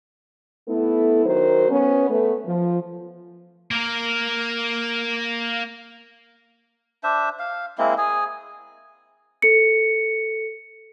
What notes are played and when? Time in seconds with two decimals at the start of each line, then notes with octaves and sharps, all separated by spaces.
0.68 A3 B3 E4 A4
1.25 D#3 F#3 A#4 C5
1.69 B3 C#4
2.09 A3 B3
2.45 F3
3.71 A#3 A#4
7.04 D4 C5 E5
7.39 F5
7.78 G#3 A#3 C4 E4
7.98 G#4 G#5
9.42 A4 C#7